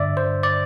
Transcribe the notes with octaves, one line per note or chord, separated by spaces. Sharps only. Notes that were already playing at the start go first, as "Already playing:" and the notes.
Already playing: G2 D3 D5 E5
C5
D5